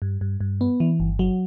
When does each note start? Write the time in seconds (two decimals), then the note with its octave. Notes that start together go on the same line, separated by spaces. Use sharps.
0.02 G2
0.21 G2
0.41 G2
0.61 B3
0.80 E3
1.00 G1
1.19 F#3